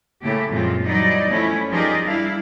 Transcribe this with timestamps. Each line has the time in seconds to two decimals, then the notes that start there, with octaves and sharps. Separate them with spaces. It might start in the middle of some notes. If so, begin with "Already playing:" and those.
0.22 A2 C#3 A3 A#3 G4
0.51 F#2 A#2 F3 G#3 C4 F4
0.84 E3 F#3 G3 D#4 D5 D#5
1.30 F3 G3 A3 C#4 E4
1.70 F3 D#4 G4 G#4 A#4 D5
2.06 G3 D4 E4 F5